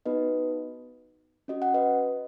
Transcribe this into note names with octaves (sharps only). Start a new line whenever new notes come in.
B3 D#4 F#4 B4 D#5
C#4 F#4 D#5
F#5
B4 D#5